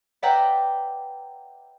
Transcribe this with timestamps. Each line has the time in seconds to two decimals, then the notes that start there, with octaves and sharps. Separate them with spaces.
0.22 B4 D5 E5 F#5 G5 A#5